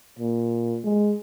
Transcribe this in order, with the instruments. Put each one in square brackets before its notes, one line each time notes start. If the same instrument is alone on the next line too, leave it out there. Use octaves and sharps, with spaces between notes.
[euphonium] A#2
G#3